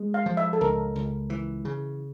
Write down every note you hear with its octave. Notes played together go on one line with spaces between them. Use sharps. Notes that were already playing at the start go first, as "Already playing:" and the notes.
Already playing: G#3
F5
F3
E5
A4
C#2 A#4
C#2
E3
C#3